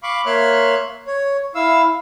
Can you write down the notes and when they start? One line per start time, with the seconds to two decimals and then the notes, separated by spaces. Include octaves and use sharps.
0.03 F5 B5 C#6 D6
0.26 A#3 C#5 E5 C6 F6 F#6
1.07 C#5
1.55 E4 F5 E6